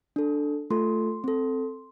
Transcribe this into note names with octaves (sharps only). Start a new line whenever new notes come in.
D4 A4
A3 F4 A4 C6
C4 A4